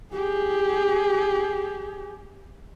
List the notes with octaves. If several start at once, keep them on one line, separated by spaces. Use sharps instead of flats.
G4 G#4